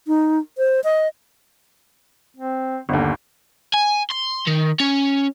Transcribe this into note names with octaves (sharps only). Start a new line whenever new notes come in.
D#4
C5
D#5
C4
G1 D#2 D3
G#5
C6
D#3
C#4